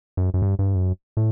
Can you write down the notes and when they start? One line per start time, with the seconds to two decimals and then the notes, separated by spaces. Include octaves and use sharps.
0.17 F#2
0.34 F#2
0.42 G2
0.59 G2
0.75 F#2
1.17 A2